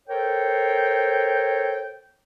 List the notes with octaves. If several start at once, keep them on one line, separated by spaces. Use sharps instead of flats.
A4 A#4 C5 C#5 G5